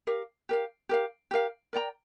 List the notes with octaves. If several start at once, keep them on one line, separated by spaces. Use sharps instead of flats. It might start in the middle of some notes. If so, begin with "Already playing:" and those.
G4 A#4 F5
G4 A#4 F5
G4 A#4 F5
G4 A#4 F5
A#4 D5 G5 A#5